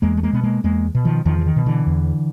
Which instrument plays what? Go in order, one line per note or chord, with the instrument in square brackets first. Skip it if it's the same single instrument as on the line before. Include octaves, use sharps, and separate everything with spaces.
[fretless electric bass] E2 G#3 A#3
A3
G#3 A#3
B2 B3
G#3 A#3
E2 G#3 A#3
B2
D#3 F3
E2 D#3 F3
E3
D#3
B2
D3 E3
E2